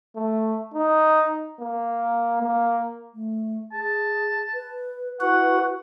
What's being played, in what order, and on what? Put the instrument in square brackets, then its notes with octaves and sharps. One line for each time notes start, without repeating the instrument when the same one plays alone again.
[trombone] A3
D#4
A#3
A#3
[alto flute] A3
[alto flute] G#4 [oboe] A5
[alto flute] B4
[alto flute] E4 [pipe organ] F#4 B4 [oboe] F#5